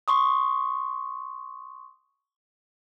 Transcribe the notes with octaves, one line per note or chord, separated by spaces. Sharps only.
C6 C#6 D#6